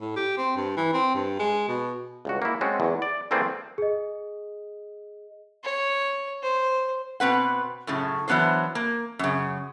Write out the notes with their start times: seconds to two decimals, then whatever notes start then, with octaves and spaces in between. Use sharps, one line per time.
0.01 A2
0.16 G4
0.37 C4
0.56 G2
0.77 E3
0.93 C4
1.15 G2
1.39 G#3
1.68 B2
2.25 C#2 G2 F#4
2.42 A#3 E4
2.61 G#3 C4 C#4 F#4 A4
2.80 E2
3.02 D5
3.31 E3 A3 A#3 C4 G#4 D5
3.78 G#4 D#5
5.64 C#5
6.43 C5
7.20 B2 C4 B4 F#5
7.87 F#2 A2 C#3
8.28 E3 F#3 B3 D4 C5
8.75 A#3
9.19 F#2 C#3